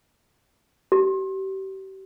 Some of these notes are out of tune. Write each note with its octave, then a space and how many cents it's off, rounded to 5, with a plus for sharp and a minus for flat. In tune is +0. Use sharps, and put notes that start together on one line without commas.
G4 -35